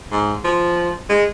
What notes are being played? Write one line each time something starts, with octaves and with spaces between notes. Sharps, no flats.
G#2
F3
G#3